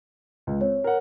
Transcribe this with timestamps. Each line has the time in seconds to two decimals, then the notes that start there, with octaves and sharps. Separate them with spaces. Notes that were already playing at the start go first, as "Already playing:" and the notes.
0.47 C#2
0.61 C4 C#5
0.84 A#4 F#5